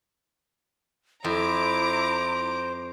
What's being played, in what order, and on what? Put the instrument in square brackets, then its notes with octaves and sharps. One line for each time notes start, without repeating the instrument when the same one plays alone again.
[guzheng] F2 [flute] E4 [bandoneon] C5 [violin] A#5 D6